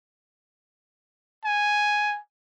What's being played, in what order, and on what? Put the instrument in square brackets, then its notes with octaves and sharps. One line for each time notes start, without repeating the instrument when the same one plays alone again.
[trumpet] G#5